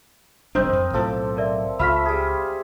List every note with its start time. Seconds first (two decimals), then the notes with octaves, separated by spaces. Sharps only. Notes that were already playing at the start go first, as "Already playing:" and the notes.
0.55 E1 G3 C4 D4 A#4 C5 D#5 G6
0.73 F2
0.93 B1 A2 F3 A4 D6
1.37 A#4 D5 E5
1.79 C#2 A3 F4 E5 B5 F6 B6
2.06 G3 G#4